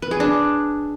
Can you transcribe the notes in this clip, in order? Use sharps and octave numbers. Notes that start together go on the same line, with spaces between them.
B4
G#4
D4